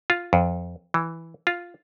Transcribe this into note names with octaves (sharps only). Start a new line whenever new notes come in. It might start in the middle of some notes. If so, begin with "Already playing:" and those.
F4
F2
E3
F4